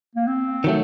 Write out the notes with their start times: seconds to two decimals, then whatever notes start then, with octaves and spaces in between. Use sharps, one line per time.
0.16 A#3
0.27 C4
0.64 D#3 F#3 A3